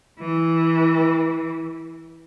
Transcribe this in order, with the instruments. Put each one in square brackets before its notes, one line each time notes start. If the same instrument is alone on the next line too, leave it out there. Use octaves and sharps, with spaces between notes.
[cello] E3